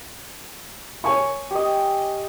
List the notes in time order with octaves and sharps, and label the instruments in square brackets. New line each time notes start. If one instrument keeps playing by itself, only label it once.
[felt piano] C#5 G#5 C#6
[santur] G4 D#5